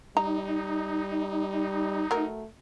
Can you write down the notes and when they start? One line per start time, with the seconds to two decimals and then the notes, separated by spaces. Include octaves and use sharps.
0.17 G3 D#4 A#5
2.11 F#3 A3 A#4